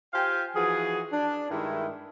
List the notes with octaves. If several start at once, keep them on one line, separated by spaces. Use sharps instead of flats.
F4 G4 C5 F5 G5 G#5
E3 F3 F#4 G#4
D4
G2 D#3 G#3 E4